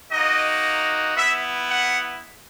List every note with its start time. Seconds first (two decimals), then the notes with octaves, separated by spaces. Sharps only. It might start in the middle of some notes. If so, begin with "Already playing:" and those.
0.11 A#3 D#4 F#4 D#5
1.16 B3 E4 E5
1.69 F#5